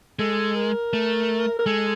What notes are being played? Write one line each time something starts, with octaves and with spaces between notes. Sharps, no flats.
G#3 A4
A#4
A3
A#4
G#3 A4